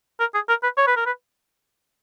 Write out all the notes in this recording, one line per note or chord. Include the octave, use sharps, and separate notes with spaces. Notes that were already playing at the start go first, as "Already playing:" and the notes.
A#4
G#4
A#4
B4
C#5
B4
A#4
B4